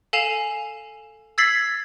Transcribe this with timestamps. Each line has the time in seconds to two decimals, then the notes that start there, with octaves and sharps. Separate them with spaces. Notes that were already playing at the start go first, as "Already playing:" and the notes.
0.13 A4 F5 G#5 C7 E7 F7
1.38 E6 G#6 A6 B6 C7 F#7